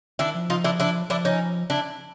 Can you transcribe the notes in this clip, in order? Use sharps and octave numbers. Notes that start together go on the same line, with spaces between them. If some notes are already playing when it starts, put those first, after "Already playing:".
D#3 D4 E4
F3
D#4 F4
D4 E4
D4 E4
F3 D4 E4
C#4 D#4
D4 E4